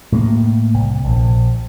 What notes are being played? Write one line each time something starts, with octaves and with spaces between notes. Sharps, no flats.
A2 A#3
C2
A#1